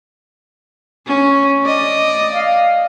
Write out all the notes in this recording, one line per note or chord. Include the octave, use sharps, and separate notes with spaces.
C#4
D5 D#5
F5